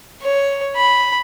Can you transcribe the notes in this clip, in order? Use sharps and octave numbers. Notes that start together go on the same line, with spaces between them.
C#5
B5